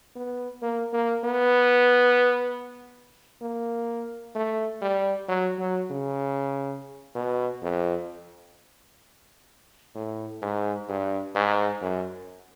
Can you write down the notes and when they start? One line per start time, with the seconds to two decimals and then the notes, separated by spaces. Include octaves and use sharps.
0.16 B3
0.62 A#3
0.93 A#3
1.24 B3
3.42 A#3
4.36 A3
4.82 G3
5.29 F#3
5.60 F#3
5.91 C#3
7.15 B2
7.62 F2
9.95 A2
10.42 G#2
10.89 G2
11.36 G#2
11.82 F#2